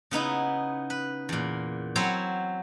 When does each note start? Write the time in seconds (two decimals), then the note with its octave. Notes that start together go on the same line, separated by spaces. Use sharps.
0.11 C#3 B3 D#4 E4
0.90 B4
1.29 E2 A#2
1.95 F#3 C4 E4 C5 C#5